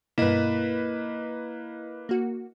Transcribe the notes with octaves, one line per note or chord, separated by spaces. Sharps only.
G2 B2 A#3 E4 B4 D#5
A#3 F#4